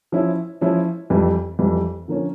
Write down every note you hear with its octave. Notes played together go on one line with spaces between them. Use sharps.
F3 C#4 E4
F3 C#4 E4
F2 E3 G3
F2 E3 G3
D3 F3 A#3 C#4